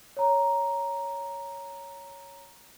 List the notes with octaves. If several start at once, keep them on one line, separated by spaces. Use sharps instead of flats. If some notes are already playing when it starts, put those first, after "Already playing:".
C#5 A#5